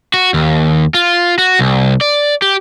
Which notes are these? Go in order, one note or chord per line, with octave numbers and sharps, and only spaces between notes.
F#4
D#2
F4
F#4
C2
D5
G4